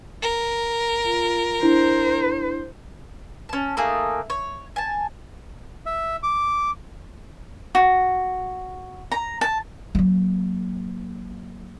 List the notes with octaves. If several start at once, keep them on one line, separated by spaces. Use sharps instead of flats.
A#4
F4
D4 E4 C5
C#4 A5
A3 A#3 D#4 G#4
C#5
G#5 A5
E5
D6
F#4
A#5
A5
F#3 A#3